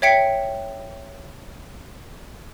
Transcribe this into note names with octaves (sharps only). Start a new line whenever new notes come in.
C#5 E5 G5 B6 C#7